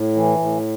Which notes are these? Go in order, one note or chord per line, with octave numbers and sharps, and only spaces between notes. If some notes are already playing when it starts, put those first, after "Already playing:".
Already playing: A2
E3
A2